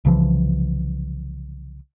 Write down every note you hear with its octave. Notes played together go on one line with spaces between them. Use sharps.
C2 C#3 E3 F3